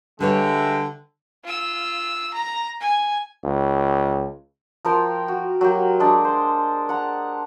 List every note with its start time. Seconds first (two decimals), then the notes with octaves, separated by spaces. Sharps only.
0.20 D3 G3 G#3 B4 C#5 E5 G5
1.44 F4 E6
2.34 A#5
2.80 G#5
3.44 C#2
4.85 F3 A#4 G5 C6
5.28 F#4
5.61 F#3 A#3 G4
6.00 G#3 D4 D5
6.24 C5
6.89 F#5 A#5